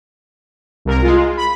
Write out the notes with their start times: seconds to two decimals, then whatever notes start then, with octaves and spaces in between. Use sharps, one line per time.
0.85 C2 A#4
1.02 G#3 F4
1.37 B5